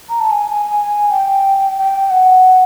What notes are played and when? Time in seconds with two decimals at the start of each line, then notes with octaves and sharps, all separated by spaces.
0.09 A#5
0.20 A5
0.31 G#5
1.10 G5
1.77 G5
2.10 F#5